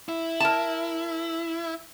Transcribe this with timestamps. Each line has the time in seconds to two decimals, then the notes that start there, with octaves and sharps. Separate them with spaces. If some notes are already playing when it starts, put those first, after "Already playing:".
0.09 E4
0.40 A#4 A5